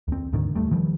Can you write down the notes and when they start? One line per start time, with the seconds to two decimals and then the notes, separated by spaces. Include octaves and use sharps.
0.08 D#2 C4
0.33 D2 G#2 D3 D#3
0.54 D#2 G3 A3
0.71 D#3 F3 G3